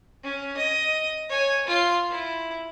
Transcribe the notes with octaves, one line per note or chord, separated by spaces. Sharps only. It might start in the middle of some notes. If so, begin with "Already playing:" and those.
C#4
D#5
C#5 G#5
F4 C6
E4